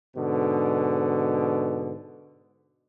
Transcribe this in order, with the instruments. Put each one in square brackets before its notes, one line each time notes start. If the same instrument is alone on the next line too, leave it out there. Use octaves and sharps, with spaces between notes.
[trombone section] G#2 B2 D3